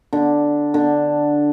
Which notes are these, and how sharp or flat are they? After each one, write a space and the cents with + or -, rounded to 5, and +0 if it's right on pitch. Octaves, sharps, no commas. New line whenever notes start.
D3 +0
D3 +5